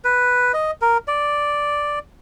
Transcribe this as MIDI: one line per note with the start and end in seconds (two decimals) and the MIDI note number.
0.05 0.52 71
0.54 0.71 75
0.82 0.98 70
1.08 1.99 74